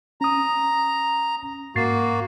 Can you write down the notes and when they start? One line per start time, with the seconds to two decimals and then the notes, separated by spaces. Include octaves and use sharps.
0.21 C#4 A#5 D#6
1.76 G#2 A#3 F#4 A6 C7